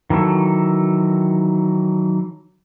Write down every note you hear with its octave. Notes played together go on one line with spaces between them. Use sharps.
D#3 E3 F#3 A4